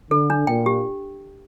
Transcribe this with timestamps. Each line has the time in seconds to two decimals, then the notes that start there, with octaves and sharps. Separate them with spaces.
0.11 D3 A4
0.30 D4
0.47 A#2 G5
0.66 G4